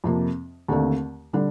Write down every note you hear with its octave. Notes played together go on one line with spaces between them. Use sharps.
F2 C3 F3 A#3
D#2 D3 A3 C4
D3 G3 D4